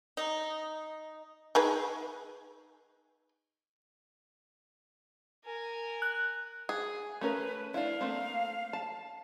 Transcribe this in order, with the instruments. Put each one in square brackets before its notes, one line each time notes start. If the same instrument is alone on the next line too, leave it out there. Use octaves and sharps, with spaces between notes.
[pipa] D#4
[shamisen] D#4 G#4 B4
[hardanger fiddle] A#4 G#5
[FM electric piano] F#6
[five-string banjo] G#4
[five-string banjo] A3 C#4 A#4 [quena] B4
[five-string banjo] D4 E4 [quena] F5
[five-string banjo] A3 A#3 C4
A5